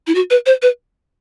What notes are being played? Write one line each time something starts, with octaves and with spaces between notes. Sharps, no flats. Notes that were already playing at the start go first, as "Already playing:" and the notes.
E4
F#4
B4
C5
B4